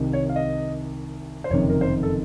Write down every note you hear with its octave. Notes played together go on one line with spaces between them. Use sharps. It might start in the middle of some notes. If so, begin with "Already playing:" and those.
Already playing: C2 C3 D#3
C#5
F5
D#5
C5
F#1 F2 C3 D#3 C#5
A#4
C5
A4